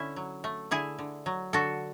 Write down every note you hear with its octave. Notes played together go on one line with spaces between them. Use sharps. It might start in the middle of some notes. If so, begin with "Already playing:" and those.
Already playing: D3 C#4 E4
F#3
A3
D3 E4 G#4
D3
F#3
D3 F#4 A4